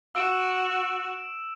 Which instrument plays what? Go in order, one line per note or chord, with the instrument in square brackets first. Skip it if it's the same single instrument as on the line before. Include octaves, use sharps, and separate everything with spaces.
[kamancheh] F#4 [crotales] E6 D7 E7